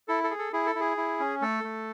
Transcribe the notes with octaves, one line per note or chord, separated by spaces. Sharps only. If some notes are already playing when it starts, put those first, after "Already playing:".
E4 A4
A4
G#4
A4
E4 G#4
A4
E4 G#4
E4
C#4
A3 A4
A3